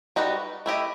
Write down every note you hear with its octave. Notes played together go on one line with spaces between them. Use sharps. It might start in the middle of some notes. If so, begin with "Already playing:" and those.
G3 D#4 F#4 B4
A3 E4 G4 D#5